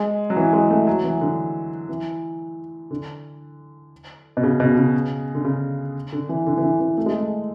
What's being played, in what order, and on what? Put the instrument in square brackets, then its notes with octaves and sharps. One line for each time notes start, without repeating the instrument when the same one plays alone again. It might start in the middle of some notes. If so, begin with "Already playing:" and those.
Already playing: [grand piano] G#3
F#3
E3
G#3
A3
F#3
E3
D3
E3
D3
B2
C#3
B2
C#3
D3
C#3
D3
E3
D3
E3
D3
E3
A3
G#3
A3